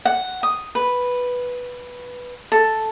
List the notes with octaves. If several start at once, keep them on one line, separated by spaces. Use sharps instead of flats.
F#5
D#6
B4
A4